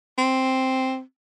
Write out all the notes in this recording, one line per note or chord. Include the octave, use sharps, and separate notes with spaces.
C4